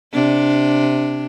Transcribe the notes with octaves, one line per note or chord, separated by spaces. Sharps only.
C3 D4